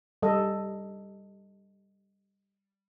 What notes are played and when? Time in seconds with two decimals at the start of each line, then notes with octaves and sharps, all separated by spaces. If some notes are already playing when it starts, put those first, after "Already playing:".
0.22 G3 A4 D#5